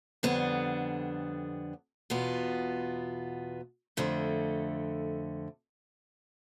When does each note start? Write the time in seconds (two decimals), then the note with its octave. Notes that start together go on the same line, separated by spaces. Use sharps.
0.23 F2 D3 G3 B3 D4
2.10 E2 B2 B3 F4
3.97 F2 D3 A3